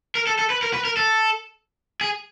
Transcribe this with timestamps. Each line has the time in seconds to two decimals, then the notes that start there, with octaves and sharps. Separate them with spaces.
0.15 A#4
0.27 A4
0.39 A4
0.50 B4
0.63 A#4
0.74 B4
0.85 A#4
0.97 A4
2.01 G#4